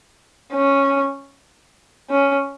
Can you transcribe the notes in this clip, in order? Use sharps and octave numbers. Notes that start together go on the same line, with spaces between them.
C#4
C#4